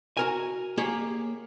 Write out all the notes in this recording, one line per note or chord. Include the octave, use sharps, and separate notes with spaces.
F#4 A#4 G#5
A#3 G4 G#4 C#5